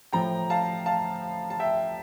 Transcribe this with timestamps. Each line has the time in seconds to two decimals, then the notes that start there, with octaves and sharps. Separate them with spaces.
0.12 A2 F3 G5 A#5
0.50 F5 A5
0.86 F5 A5
1.50 A5
1.60 E5 G5